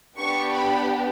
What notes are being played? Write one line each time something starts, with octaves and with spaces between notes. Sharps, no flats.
B3 D4 G4 C#6
B5